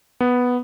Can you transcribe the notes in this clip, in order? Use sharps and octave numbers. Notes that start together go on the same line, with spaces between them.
B3